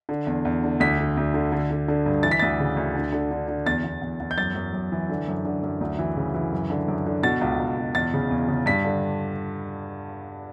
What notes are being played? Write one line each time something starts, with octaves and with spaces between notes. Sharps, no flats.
D3
E2
E2
D3
D2 B6
D3
D2
D3
D3
D3
D3
G2
E3 A6
B6
D2 A6
C#3
D2
D3
D3
D3
D3
E2 A6
E2
E2
E2
G6
F#2 A6
F#2
F#2
E3
D3
F#2
D3
F#2
D2
E3
C#3
E3
F#2
D3
F#2
D3
B2 A6
C#2
C#2
B2
E2 A6
C#3
E2
C#3
G2 B6
D3